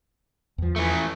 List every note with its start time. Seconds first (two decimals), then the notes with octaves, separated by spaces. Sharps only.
0.58 E2 F3
0.76 E3 A3